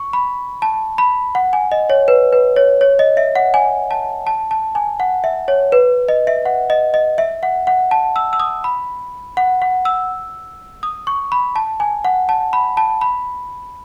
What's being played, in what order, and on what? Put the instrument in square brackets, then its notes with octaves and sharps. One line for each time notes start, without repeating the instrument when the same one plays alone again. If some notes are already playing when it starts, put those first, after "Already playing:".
Already playing: [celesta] C#6
B5
A5
B5
F#5
G#5
D#5
C#5
B4
B4
C#5
C#5
D#5
E5
F#5
G#5
A5
A5
A5
G#5
F#5
E5
C#5
B4
D#5
E5
F#5
D#5
D#5
E5
F#5
F#5
A5
E6
E6
D#6
B5
F#5
F#5
E6
D#6
C#6
B5
A5
G#5
F#5
A5
B5
A5
B5